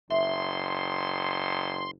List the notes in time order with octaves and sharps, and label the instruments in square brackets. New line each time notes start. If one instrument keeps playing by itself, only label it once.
[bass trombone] F#1 [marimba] E5 [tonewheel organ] C6